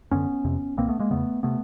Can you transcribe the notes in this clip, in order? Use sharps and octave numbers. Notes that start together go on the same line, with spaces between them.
F#2 D3 B3 C#4
F2 C3
C2 B2 A#3 C4
A3 B3
G#3 A#3
E2 C#3 A3 B3
C3 A3 B3